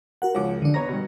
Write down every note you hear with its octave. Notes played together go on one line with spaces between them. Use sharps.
F#4 A#4 F#5
C#2 F3 F#4 C#5 D6
D3 D4
B3 C#5 A#5 A#6
G2 B2